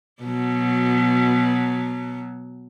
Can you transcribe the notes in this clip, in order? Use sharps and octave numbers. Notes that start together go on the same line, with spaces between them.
B2 F#3